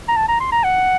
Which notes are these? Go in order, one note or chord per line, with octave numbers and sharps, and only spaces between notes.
A#5
A5
A#5
C6
A#5
F#5